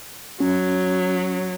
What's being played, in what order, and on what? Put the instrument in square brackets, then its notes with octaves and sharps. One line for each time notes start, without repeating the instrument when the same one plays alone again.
[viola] F#3 [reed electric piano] C#4